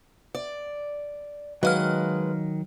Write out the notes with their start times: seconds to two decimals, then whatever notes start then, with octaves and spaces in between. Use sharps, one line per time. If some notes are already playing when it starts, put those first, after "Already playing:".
0.35 D5
1.63 D#3 F#3 G#3 B4 D#5 F5 F6